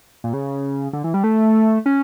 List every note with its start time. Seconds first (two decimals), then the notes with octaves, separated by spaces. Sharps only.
0.24 A#2
0.33 C#3
0.93 D3
1.04 E3
1.14 G3
1.24 A3
1.86 C#4